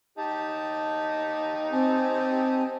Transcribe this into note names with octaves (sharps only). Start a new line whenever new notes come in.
D#4 G4 A5
C4 G#5 A5